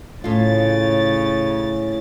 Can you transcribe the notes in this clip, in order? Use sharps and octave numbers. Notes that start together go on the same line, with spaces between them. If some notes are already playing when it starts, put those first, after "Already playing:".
A2 C#3 F4 A6